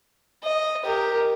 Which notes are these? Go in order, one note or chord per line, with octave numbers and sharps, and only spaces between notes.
D#5
G4 A#4